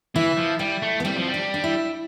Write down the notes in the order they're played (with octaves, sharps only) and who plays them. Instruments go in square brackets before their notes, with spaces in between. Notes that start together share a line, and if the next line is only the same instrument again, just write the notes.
[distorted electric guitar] E3 [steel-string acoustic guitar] E4
[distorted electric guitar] F3
[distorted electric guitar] G3 [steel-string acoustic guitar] E4
[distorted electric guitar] A3
[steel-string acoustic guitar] B3
[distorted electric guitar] G3 [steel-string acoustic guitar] C4
[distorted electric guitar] F3
G3
[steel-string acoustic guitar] D4
D4
E4